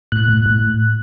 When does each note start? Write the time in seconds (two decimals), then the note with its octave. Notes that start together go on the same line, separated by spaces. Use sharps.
0.12 A2 F#6
0.28 A2
0.46 A2